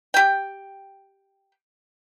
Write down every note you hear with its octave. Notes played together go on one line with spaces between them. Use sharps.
G4 G5